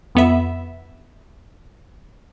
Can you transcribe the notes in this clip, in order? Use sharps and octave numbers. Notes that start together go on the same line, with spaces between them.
F2 B3 E5